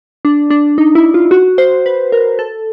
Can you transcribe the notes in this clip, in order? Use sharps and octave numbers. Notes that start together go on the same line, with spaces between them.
D4
D4
D#4
E4
F4
F#4
C5
B4
A#4
A4